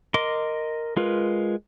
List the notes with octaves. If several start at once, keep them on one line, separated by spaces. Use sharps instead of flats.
A#4 D#5 C6 D6
G#3 F4 A#4 B4